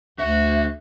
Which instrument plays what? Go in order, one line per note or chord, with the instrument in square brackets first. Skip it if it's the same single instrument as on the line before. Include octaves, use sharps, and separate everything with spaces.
[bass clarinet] D2 [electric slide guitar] D3 E5 [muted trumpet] F#4